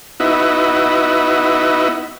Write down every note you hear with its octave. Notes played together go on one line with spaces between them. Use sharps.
B3 D#4 E4 F#4